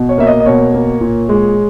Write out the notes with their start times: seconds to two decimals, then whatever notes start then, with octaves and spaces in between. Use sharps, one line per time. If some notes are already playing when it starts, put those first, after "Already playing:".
Already playing: B2
0.09 C#5
0.18 A#3 E5
0.27 D#5
0.40 D#5
0.46 B2 C#5
0.74 A#3
1.01 A#2
1.29 G#3